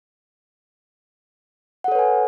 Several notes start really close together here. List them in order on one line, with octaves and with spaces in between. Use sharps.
F#5 A4 C#5 B4 G#5